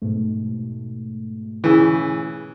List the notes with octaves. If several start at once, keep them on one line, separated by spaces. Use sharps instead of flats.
G#2 B2 A3
C#3 E3